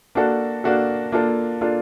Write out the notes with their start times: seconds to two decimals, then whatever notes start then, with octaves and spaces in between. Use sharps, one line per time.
0.15 A#3 D4 F#4 A4
0.64 A#3 D4 F#4 A4
1.12 A#3 D4 F4 A4
1.61 A#3 D4 F4 A4